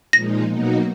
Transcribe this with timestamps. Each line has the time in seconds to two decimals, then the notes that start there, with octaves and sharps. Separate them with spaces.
0.13 A#2 F3 G#3 D#4 A#6
0.48 B2 F#3 A#3 D#4 F#4